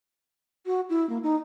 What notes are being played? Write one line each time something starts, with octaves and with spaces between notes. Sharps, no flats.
F#4
E4
A#3
D#4